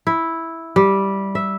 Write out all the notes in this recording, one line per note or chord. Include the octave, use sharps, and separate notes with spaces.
E4
G3
E5